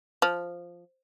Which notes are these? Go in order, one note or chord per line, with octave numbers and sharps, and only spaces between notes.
F3